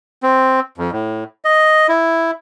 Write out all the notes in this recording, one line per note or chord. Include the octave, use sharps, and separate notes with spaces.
C4
F2
A2
D#5
E4